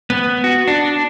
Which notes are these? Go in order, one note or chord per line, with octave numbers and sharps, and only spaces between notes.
B3
F#4
D4